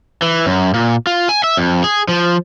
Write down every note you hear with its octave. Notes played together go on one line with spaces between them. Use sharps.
E3
F#2
A#2
F4
G#5
E5
F2
G#4
F3